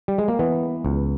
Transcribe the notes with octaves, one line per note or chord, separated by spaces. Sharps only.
G3
G#3
A#3
E3 B3
C#2